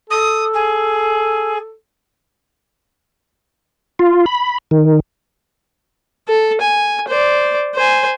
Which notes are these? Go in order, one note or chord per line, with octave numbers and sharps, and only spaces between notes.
A4 D#6
G#4
F4
B5
D#3
A4
G#5
C5 D5
C5 G#5